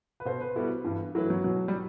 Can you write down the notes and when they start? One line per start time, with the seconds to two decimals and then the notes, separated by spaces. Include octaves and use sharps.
0.20 B4
0.25 B2 C5
0.41 B4
0.56 G3 B3 E4 F#4 A4
0.85 G2 E3
1.15 E3 F#3 A3 E4 B4
1.30 F#3
1.44 B2 F#3
1.68 G3